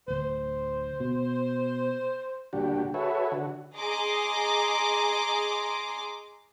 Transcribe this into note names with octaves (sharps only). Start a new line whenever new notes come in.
D1 D2 C5
B2
D2 A#2 G3 D4 F#4 G4
F#4 G#4 A4 B4 C#5 E5
D3 F#4
G#4 D#5 A#5 C6 D6